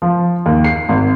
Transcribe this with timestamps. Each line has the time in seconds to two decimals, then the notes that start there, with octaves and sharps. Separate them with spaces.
0.02 F3
0.46 D#2
0.64 C7
0.89 G#1